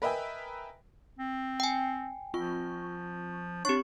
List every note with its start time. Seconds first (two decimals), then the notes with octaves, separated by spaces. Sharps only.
0.02 A#4 B4 D#5 E5 G5 G#5
1.19 C4
1.60 G5 G#5
2.34 F3 C4 F4 C#6
3.65 C4 D4 G4 C#5 C#6